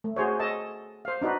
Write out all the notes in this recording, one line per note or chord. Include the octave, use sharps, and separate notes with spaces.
A3
F#4 G#4 C5 C#5
A4 D#5 A5
C5 F5
D4 D#4 F#4 B4